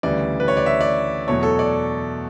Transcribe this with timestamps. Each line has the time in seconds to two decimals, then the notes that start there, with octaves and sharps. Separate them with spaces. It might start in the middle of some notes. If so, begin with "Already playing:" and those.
0.03 D2 C#3 E3 G3 D5
0.40 B4
0.48 C#5
0.57 D5
0.66 E5
0.81 D5
1.27 E2 B2 F#3 A3 C#5
1.43 A4
1.59 D5